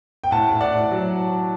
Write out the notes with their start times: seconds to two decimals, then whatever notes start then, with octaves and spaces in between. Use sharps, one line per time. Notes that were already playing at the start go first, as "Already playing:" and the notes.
0.24 G5
0.31 A2 F#5 A5
0.51 A2
0.61 D5 F#5
0.72 A2
0.91 F#3